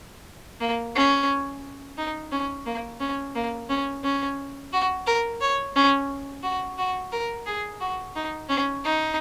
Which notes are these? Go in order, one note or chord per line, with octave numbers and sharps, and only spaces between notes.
A#3
C#4
D#4
C#4
A#3
C#4
A#3
C#4
C#4
F#4
A#4
C#5
C#4
F#4
F#4
A#4
G#4
F#4
D#4
C#4
D#4